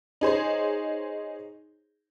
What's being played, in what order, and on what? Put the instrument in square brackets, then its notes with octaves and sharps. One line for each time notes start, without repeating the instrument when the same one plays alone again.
[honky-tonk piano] D#4 G#4 C5 C#5